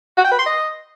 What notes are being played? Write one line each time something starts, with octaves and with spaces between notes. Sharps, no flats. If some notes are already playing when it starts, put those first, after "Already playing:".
F#4
G5
B4
C6
D#5